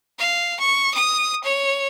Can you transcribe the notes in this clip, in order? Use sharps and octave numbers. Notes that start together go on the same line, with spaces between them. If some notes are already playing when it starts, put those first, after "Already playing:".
F5
C#6
D#6
C#5